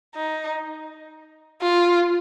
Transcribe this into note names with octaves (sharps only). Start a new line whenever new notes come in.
D#4
F4